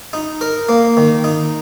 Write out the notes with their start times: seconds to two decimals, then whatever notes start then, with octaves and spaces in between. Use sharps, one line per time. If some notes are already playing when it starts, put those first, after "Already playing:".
0.13 D#4
0.41 A#4
0.69 A#3
0.97 D#3
1.24 D#4